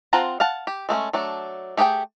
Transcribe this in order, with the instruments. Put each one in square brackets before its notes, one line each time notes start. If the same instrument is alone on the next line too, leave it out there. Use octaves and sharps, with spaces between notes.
[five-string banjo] C4 F4 F#5 A5 A#5
F5 F#5 A5
G4
G#3 A3 B3 C#4
F#3 A3 D4
A3 G4 G#4 B4 G5